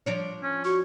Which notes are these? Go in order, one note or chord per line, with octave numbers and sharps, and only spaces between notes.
F3 D4 C#5
C#4
F#4 C#6